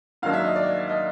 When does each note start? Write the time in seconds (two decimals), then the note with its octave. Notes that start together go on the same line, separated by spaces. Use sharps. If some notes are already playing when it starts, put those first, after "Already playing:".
0.22 G#2 D#3 F#3 A#3 D4 F5
0.33 E5
0.44 D#5
0.56 D5
0.89 D#5